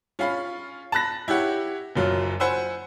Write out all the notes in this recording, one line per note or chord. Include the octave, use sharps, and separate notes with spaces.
C#4 F4 F5 B5
A5 B5 F#6 A#6
E4 G4 C#5 F#5
F#1 F#2 F#3 F4
C5 F#5 G#5 B5 E6